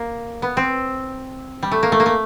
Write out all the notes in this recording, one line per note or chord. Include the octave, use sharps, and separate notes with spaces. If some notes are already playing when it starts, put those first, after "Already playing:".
Already playing: A#3
B3
C4
G3
A3
A#3
A3
A#3
A3